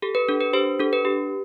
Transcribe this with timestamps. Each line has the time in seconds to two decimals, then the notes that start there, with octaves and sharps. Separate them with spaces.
0.02 G4 A4
0.15 B4
0.29 D4 A4
0.41 B4
0.53 G4 C5
0.79 D4 A4
0.93 B4
1.05 G4